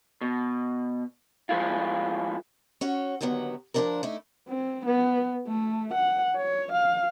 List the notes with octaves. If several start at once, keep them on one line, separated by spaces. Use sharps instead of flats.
B2
F3 G#3 A3 E4 F4
C#4 F#4 C#5
D#2 D3 D#3 F#3 B3
D2 A#2 F3 D4 F4 A#4
A3 D#4 E4
C4
B3
A3
F#5
C#5
F5